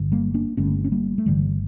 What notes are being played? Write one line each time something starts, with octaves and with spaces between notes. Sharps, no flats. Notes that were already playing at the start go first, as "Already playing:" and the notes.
Already playing: G1 G2 D3
G3 A#3
A#3 D4
G1 G2 D3 A3 C#4
C#4
G3 A#3
A3
G1 G2 D3 E3 G3